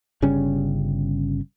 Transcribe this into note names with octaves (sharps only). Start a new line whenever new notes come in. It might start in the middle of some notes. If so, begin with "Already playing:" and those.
G1 C#3 G3 C#4